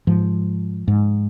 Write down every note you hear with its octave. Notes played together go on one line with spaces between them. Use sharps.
G#2 F3
G#2